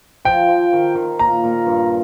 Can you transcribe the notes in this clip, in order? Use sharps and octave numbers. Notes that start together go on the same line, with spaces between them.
F3 G5
F3
D#3
D#3
A#2 A#5
A#2
G2